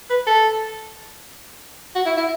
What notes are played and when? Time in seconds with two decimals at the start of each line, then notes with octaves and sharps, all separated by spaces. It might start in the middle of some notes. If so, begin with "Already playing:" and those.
0.10 B4
0.27 A4
1.96 F#4
2.06 E4
2.17 E4